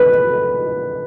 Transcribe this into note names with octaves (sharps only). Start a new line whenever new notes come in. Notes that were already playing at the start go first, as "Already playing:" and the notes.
Already playing: B4